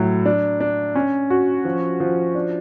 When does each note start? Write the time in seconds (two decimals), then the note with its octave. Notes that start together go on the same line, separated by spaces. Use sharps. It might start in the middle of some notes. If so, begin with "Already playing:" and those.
Already playing: A2 F#3
0.25 D4
0.61 D4
0.95 C#4
1.30 F#4
1.65 F3
2.00 F3
2.35 D4